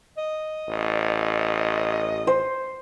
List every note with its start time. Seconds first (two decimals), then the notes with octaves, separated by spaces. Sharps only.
0.18 D#5
0.69 A1
2.27 C5